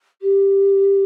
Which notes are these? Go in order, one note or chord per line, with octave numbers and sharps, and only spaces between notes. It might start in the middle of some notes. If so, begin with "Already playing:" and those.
G4